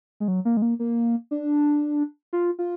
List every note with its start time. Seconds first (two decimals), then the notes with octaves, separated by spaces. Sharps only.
0.20 G#3
0.28 F#3
0.45 A#3
0.57 G#3
0.62 A#3
0.79 A#3
1.31 D4
2.33 F4
2.59 F4